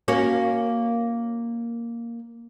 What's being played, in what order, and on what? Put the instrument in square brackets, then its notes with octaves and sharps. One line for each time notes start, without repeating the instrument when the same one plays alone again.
[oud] A#3 C#4 F#4